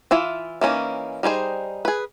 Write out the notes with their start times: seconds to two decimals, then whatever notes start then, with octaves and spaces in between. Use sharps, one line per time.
0.11 E3 E4 F4 E5
0.61 E3 A#3 C#4 D#4
1.23 G3 D#4 G#4 C5
1.85 G#4 B4